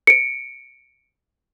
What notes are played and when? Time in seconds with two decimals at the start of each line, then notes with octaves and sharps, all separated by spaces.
0.07 C#7 D7